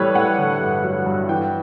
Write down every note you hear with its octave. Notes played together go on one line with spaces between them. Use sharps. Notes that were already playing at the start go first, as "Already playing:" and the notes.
Already playing: A2 E3 G3 A4 B4 C#5
A2 F#5
D3
G2
F#3
G2
E3 G5